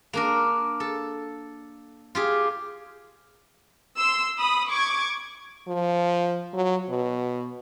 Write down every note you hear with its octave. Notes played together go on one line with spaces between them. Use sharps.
A#3 D4 A#4
A4
F4 G4 G#4
C6 E6
B5 D#6
C#6 D6 G#6
F3
F#3
B2